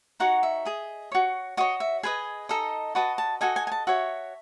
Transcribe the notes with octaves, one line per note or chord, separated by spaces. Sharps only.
D#4 F#4 C#5 F#5
E5
G#4 D#5
F#4 C#5
F#4 C#5 D#5
E5
G#4 B4 D#5 G#5
D#4 A4 D#5
F#4 B4 D#5 A5
A5
F#4 A4 D#5 G#5
G#5
G#5
A5
F#4 C#5 E5